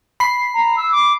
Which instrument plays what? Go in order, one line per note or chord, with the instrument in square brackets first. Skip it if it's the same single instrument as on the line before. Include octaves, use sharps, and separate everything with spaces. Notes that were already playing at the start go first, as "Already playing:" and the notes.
[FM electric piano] B5 C7
[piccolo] A#5
E6
D6